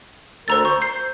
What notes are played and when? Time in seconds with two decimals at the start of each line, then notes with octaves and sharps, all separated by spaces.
0.48 D2 A4 A#4 C5 A#5 A6
0.65 C5 C#6
0.82 G6 C7